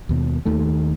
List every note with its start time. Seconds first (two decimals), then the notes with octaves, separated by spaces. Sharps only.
0.09 D#2 B2
0.45 D#2 D#3 A3